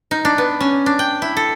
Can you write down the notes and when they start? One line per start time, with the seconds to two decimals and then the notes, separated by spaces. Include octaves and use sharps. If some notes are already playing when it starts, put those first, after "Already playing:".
0.11 D#4
0.25 D4
0.38 B3
0.60 C#4
0.86 D4
0.99 G5
1.22 E4
1.37 A4